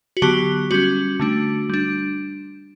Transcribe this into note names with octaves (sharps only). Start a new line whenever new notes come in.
F#4
D3 F#3 B3 G4
G3 C#4 F#4
D3 A3 D4
G3 D4